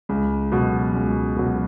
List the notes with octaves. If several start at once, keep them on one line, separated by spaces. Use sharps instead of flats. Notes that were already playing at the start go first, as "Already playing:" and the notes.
C#2
B2 F#3
C#2
B2 F#3